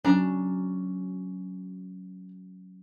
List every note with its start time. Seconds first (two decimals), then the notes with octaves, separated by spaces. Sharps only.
0.05 F#3 C#4 D4 A#5